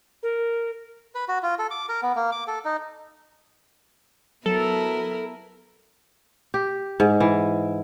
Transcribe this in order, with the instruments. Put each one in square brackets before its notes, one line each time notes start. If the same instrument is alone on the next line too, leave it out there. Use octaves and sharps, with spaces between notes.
[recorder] A#4
[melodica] B4
F#4
F4
A4
D6
A#4
B3
A#3
D6
A4
D#4
[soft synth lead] F#3 [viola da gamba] B3 E4 A#4 [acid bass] A4
[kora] G4
G#2
E3